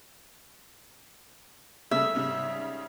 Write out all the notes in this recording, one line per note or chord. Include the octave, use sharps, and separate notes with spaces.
C#3 G3 A3 E5
G#2 C#3 G3